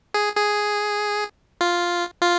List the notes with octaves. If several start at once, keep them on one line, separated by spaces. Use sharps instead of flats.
G#4
G#4
F4
F4